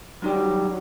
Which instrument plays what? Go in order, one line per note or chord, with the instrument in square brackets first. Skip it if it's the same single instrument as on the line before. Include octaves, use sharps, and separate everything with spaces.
[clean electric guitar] F#2 D#3 G3 [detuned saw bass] F#3